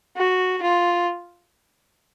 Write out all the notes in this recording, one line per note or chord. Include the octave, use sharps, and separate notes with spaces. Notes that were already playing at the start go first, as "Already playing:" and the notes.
F#4
F4